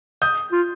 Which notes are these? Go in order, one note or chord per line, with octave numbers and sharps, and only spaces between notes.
D#6 G6
F4